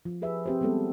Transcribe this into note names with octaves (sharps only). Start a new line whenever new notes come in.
F3
G4 G#4 B4 E5
C4 G4 C5
G3 G#3 B3 C4 A4